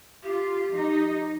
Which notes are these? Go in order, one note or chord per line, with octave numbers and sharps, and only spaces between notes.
F4 G4
F3 D#4